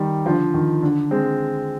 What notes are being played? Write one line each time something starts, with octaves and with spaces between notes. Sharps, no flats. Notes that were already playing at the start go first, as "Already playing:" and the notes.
Already playing: D#3 G3
D3 F3
D#3
D3
G#3 C4